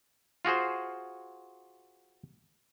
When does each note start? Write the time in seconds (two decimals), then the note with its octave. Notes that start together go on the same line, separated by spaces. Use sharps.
0.45 F4 F#4 G#4 C5